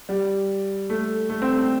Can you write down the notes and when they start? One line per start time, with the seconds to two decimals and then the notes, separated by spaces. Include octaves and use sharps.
0.09 G3
0.90 A3
1.30 A3
1.42 C4
1.54 A3